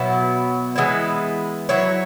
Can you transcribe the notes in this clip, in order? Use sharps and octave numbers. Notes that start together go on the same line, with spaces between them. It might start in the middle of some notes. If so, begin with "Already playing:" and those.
Already playing: B2 F#3 B3 E4
E3 G#3 B3 E4
F#3 E4 C#5